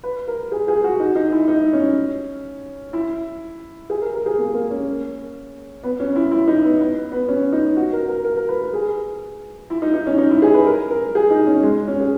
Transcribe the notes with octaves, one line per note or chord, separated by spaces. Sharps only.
B4
A#4
G#4
G#4
F#4
D#4
D#4
E4
D#4
C#4
E4
G#4
A#4
A#4
G#4
A#3
A#3
C#4
B3
C#4
E4
E4
D#4
B3
B3
B3
C#4
D#4
F#4
A#4
A#4
A#4
A#4
B4
A#4
G#4
E4
D#4
D#4
C#4
D#4
E4
G#4
B4
A#4
A#4
G#4
D#4
C#4
G#3
C#4
G#4